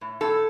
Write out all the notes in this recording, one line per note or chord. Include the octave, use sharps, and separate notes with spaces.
A2
A2 A4